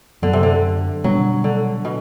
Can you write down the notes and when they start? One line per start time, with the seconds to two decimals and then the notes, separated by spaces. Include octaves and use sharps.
0.22 F#2 D3 F#3 B3
0.33 C3
0.43 D3
1.04 B2 F#3 G3 B3 D4
1.44 D3
1.85 B2